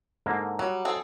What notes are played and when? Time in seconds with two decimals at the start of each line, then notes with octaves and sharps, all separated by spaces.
0.26 G#2 D3 A#3
0.59 F#3 G3
0.85 C4 G#4 A4